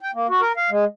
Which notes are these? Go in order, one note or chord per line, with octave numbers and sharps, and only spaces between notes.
G5
A#3
F#4
A#4
F5
G#3